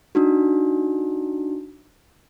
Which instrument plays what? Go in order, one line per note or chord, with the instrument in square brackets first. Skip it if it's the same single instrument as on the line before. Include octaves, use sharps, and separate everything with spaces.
[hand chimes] D4 D#4 F#4